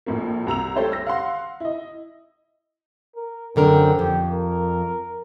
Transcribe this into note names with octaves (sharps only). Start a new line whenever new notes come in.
A#1 A2 A#3
C2 A#5 E6 F7
G3 A3 G4 A4 C5 C#5
E6 A#6
F5 F#5 C6
E4 D#5
A#4
F#2 D3 C4 A#4
F2 G4
A#4